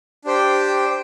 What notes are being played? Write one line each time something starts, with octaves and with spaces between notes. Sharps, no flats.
D4 G4 C5 G5